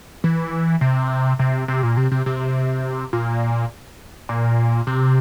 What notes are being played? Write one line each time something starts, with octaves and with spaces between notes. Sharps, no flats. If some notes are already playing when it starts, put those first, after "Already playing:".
E3
C3
C3
C3
A#2
C3
C3
C3
A#2
A#2
C3